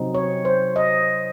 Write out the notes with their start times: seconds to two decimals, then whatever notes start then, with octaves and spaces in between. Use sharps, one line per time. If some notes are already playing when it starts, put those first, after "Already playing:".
Already playing: C3 F#3 C4 D#4
0.15 C#5
0.45 C5
0.76 D#5